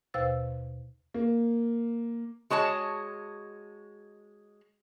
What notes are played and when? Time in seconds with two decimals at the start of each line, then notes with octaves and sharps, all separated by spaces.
0.14 D#2 B2 C5 F5 E6 A6
1.14 A#3
2.50 G#3 F#4 C#5 A5